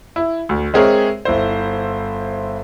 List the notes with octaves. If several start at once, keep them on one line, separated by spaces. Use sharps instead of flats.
E4
D2
G#3 C4 G#4 A#4 C#5 E5
G1 E4 C5